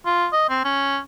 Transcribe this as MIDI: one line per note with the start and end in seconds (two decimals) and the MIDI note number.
0.05 0.27 65
0.33 0.45 75
0.50 0.62 60
0.65 0.99 61